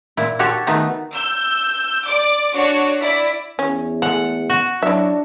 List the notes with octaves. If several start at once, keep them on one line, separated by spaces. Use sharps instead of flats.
A#2 E4
F#4 G4 A4 C#5
D#3 A3 B3 D#4 F#4 B4
E6 G6
D5 D6
D4 F#4 C#5 D5
E4 D5 B6
E2 C#4
G#3 A3 F#5
F#4
F#3 D4 E4 E5